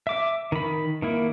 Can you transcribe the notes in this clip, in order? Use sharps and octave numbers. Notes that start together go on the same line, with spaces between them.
E5 D6
D#3 B5
D#3 A#3 E4